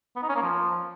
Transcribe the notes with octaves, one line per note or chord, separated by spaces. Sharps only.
B3
D#4
C#4
A#3
F3